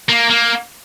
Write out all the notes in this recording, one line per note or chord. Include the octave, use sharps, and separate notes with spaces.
A#3
A#3